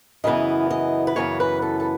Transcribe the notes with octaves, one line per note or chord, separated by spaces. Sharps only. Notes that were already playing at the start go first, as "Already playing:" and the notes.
F#2 C#3 E3 B3 D#5
D#5
B4
F#2 C#3 E3 B3 C#5
B4
A4
A4